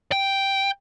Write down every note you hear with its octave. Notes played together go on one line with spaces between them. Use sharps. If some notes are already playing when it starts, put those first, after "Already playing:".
G5